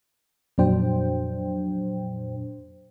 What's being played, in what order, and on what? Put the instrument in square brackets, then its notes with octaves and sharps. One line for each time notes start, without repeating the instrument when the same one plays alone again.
[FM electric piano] F2 A#2 F#3 D4 C5 G5